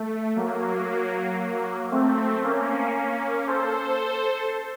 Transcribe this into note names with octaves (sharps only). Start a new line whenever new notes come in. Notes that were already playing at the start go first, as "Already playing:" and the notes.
Already playing: A3
F#3 A#3
A3 C4
A#3 C#4
A#3 C#4
A4 C5